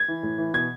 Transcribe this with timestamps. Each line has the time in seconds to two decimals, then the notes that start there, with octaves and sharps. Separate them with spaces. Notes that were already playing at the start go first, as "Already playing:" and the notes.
Already playing: G#6
0.08 E3
0.23 A2
0.38 E3
0.54 B2 G#6